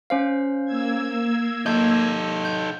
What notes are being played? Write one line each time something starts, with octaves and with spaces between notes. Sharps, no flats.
C#4 C5 F5
A#3 E6 G#6
D#4 A4 G6
G6